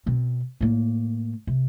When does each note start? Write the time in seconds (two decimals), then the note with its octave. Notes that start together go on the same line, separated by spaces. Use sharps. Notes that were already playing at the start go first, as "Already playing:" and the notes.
0.06 B2 C4
0.61 A2 A#3
1.47 C3